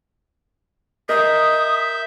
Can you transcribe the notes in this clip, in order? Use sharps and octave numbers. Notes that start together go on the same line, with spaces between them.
A#4 D#5 E5 D#6 G6